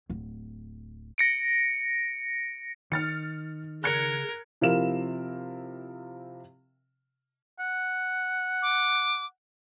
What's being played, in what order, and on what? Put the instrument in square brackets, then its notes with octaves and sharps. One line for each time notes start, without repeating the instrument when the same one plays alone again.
[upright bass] D1
[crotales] A#6 C#7 D7
[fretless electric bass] D#3 [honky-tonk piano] F6 A6 C#7
[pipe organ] C#3 [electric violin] A#4 [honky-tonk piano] F#6 G#6 C#7
[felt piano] C3 F3 E4 A#4 F5 E7
[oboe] F#5
[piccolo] D6